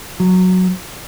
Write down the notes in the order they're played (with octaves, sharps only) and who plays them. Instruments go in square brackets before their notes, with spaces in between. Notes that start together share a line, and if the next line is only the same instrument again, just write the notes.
[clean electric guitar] F#3